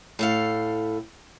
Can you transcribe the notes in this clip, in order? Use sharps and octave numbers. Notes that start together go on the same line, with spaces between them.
A2 A4 F5